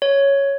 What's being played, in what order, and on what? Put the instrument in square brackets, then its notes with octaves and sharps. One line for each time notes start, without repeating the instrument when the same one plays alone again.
[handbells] C#5